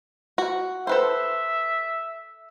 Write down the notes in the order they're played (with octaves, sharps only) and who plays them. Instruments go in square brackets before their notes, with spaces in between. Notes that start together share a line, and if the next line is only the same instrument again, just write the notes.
[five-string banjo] F#4
[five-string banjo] A4 B4 C5 [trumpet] E5